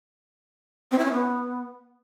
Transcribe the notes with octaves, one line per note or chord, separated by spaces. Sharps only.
C4
E4
C#4
B3